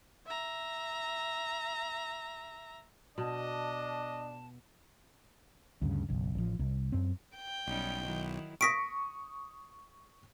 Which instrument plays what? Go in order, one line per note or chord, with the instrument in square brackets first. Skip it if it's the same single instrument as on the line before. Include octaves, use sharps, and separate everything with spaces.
[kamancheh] E5 A#5
[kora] B2 [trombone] D4 [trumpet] D#5 [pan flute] A5
[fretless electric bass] D2 G2 C#3
F#1 B1
A1 F3
C2
F#2 C4
[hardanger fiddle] G5
[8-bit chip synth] B1 [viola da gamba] G3 C#4 D#4
[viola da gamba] D#3 F#3 E4
[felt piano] C#6 D#6 [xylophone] A#6 B6 D7